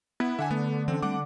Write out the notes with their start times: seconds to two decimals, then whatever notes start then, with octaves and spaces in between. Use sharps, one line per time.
0.20 B3 E4
0.39 D3 E5 F#5 G#5
0.51 A3 B3
0.88 E3 C4 C#4
1.02 G3 A3 C4 F#5 D6